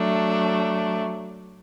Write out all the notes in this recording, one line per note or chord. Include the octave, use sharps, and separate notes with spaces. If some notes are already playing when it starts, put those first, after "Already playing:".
Already playing: F#3 A3 D4